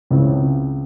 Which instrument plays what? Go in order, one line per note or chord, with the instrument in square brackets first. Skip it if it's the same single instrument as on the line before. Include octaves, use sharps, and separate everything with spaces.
[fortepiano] C#2 C#3 E3 C4